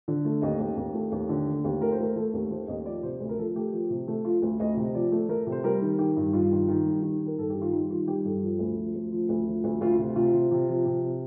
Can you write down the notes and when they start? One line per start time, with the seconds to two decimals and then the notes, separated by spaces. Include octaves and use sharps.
0.08 D3
0.25 A3
0.42 D#2 D#5
0.60 D#2
0.77 D#2
0.94 A3
1.12 D#2
1.29 D3
1.47 A3
1.64 D#2
1.81 A3 A#4
1.92 C5
1.99 A3 A#4
2.16 A3 A4
2.33 D#2 A#4
2.51 A3 C5
2.68 D#2 D#5
2.86 F3 D5
3.03 C3 C5
3.20 D2
3.29 A#4
3.37 F3 A4
3.55 A3 G4
3.72 F3
3.90 C3
4.08 A3
4.25 F3 F4
4.42 D2
4.60 D2 D#5
4.77 C3
4.95 F3 D5
5.12 A3
5.29 A3 A#4
5.47 C3
5.52 C5
5.64 G3 A#4
5.82 D#3
5.98 D#3 G4
6.17 G2
6.33 G2 F4
6.51 D#3
6.68 D#3
6.86 G3
7.02 D#3
7.21 D#3
7.26 A#4
7.38 G2 A4
7.50 D#3 G4
7.62 F4
7.73 G3 D#4
7.90 D#3 F4
8.07 G3 G4
8.24 G2 A4
8.43 F3
8.59 D2
8.77 F3
8.94 D2
9.12 F3
9.29 D2
9.47 F3
9.64 D2
9.81 D2 F4
9.99 C3
10.16 C3 F4
10.34 C3
10.51 C3
10.69 F3
10.86 C3